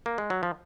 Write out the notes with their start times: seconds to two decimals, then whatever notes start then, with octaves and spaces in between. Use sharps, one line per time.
0.06 A#3
0.18 G#3
0.30 F#3
0.43 F3